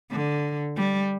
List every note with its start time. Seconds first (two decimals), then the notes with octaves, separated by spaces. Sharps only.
0.11 D3
0.77 G3